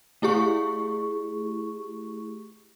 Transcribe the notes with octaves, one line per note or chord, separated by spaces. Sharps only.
A3 E4 G4 G#4 C#6